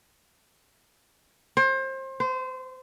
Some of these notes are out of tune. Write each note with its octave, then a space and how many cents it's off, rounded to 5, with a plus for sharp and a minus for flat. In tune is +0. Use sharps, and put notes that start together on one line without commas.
C5 +30
C5 -25